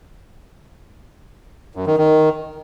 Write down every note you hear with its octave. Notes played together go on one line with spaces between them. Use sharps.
F#2
D#3
D#3